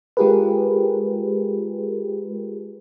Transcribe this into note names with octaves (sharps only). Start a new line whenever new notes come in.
G#3 F4 G4 G#4 A#4 B4